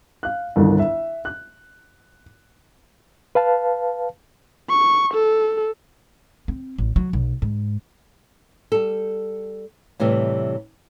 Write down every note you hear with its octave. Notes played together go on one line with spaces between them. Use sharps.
F5 F#6
G1 C2 D#3
E5
F#6
B4 F5 A5
C#6
A4
C4
A1
F#3
B1
G#2
G3 A4
A2 C3 E3 G3